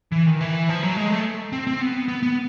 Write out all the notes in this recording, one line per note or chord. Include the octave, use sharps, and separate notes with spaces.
E3
D#3
E3
F3
F#3
G#3
A3
C4
C4
B3
B3
B3